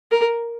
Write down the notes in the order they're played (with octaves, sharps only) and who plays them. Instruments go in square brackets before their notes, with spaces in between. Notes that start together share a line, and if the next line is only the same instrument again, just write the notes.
[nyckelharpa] A#4